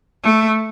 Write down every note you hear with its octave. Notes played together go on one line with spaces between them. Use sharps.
A3